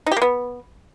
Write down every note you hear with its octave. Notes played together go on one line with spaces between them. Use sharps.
D#4
G4
A#3
B3